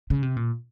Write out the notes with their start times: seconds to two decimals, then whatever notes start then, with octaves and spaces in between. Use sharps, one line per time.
0.10 C#3
0.23 C3
0.37 A#2